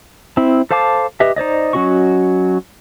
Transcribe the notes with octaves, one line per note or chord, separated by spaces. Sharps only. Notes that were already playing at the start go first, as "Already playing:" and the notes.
C4 E4
A4 C5 F5 A5 D6
G4 B4 D#5 E5
D#4 C5 D5 D#5
F#3 C#4 F#4 D#5 C#6